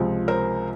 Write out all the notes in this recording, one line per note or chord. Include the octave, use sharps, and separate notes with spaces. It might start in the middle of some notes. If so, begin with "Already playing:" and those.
Already playing: C#2 C3 F3 G#3
A#4 C5